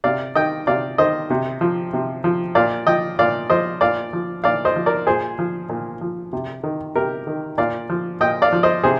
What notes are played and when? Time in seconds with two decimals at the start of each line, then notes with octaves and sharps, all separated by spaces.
0.04 C3 D5 F5
0.35 D#3 D#5 G5
0.67 C3 D5 F5
0.98 D#3 C5 D#5
1.30 C3
1.61 F3
1.93 C3
2.24 F3
2.55 A#2 D5 F5
2.87 F3 D#5 G5
3.19 A#2 D5 F5
3.50 F3 C5 D#5
3.81 A#2 D5 F5
4.13 F3
4.44 A#2 D5 F5
4.65 C5 D#5
4.76 F3
4.86 A#4 D5
5.07 A#2 G#4 C5
5.39 F3
5.69 A#2
6.01 F3
6.33 C3
6.64 D#3
6.95 C3 G4 A#4
7.27 D#3
7.58 A#2 D5 F5
7.90 F3
8.21 A#2 D#5 G5
8.42 D5 F5
8.52 F3
8.63 C5 D#5
8.83 C3 G#4 C5